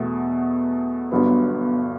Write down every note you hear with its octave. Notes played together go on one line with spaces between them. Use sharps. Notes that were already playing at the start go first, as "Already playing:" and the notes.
Already playing: E2 B2 A3
G1 G2 F#3 B3